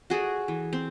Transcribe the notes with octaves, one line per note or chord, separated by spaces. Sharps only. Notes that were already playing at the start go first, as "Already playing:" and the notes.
F#4 G#4 A4 D5
E3
C4